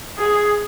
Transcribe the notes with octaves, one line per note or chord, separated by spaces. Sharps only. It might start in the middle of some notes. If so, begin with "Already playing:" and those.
G#4